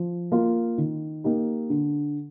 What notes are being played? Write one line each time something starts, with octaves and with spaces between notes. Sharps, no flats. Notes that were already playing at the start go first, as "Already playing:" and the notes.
Already playing: F3
A#3 F4
D#3
A#3 D#4 G4
D3